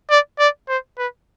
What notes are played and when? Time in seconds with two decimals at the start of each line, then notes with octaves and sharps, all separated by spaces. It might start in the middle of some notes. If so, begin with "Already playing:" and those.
0.10 D5
0.39 D5
0.68 C5
0.98 B4